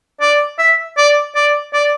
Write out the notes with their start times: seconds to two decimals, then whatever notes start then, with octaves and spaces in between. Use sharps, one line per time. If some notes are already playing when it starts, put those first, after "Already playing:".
0.21 D5
0.59 E5
0.98 D5
1.35 D5
1.73 D5